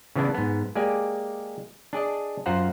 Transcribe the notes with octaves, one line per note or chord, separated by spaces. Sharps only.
C#3 E3 B3 D4 E4
G#2 B3
G#3 A#3 G4 D5 G#5
D4 G#4 D5 D#5
F#2 F4 C5 F#5 A#5